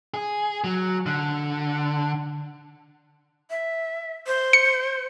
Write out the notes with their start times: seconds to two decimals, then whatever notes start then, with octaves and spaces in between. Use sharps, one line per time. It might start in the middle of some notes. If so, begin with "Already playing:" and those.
0.14 G#4
0.64 F#3
1.06 D3
3.50 E5
4.27 C5
4.53 C#7